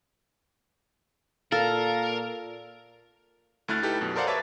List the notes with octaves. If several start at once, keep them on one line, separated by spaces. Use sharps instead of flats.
A#2 A4 A#4 F5
D2 A3 E4 F6 F#6 A6
D#4 E4 G4 A4 B4
F#2 B2
A4 A#4 C5 D5 F5 F#5
B4 C#5 E5 A5 D6 A6